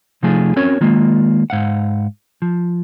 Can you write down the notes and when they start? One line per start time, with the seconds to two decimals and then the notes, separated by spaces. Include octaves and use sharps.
0.23 C3 F3 A3 D#4 F4 G#4
0.56 C4 C#4 F#4 A#4 C#5
0.81 D#3 G#3 A#3 F4
1.50 G#2 F5 F#5
2.42 F3